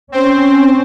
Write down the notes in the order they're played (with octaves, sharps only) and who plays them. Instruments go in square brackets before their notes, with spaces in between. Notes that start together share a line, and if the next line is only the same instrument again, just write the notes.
[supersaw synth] C4 C5 [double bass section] C#4